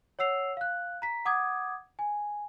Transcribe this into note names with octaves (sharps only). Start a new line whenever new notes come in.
C#5 F#5 E6 C7 F7
F5 F#6
A#5 B6
F#5 D6 D#6 G#6
G#5